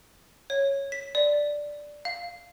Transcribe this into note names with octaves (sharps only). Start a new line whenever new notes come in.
C#5
B6
D5
F5